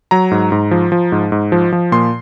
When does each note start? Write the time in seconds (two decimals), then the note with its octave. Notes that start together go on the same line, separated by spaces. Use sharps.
0.11 F#3 A#5
0.31 G#2
0.52 G#2
0.71 F3
0.92 F3
1.12 G#2
1.32 G#2
1.52 F3
1.72 F3
1.92 A#2 C6